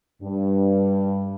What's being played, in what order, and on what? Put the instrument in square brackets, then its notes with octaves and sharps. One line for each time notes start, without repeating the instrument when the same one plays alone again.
[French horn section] G2